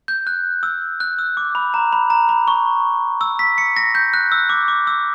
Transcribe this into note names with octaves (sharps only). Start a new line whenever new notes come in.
G6
F#6
E6
F#6
E6
D6
B5
A#5
B5
A#5
B5
C#6
E6
B6
C#7
A#6
G6
F#6
E6
D6
D6
E6